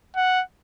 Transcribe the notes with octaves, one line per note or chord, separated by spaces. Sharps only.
F#5